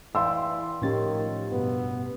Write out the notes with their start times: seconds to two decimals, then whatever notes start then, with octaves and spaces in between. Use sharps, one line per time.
0.15 E3 D5 F5 G5 B5 C6 E6
0.82 A2 D#3 F3 C#4 G4 C#5 A6
1.52 G2 B2 B3